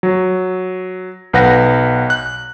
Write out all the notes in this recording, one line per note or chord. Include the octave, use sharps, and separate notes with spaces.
F#3
B1 B4 F#5 A#6
F#6